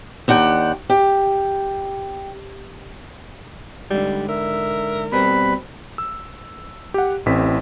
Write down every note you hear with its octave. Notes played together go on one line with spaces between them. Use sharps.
D#2 D4 F#5 G5
G4
G#2 D3 G3
A#4 E5
B2 G3 C4 B4 B5
E6
G4 F#5
A1 A2 C4 B6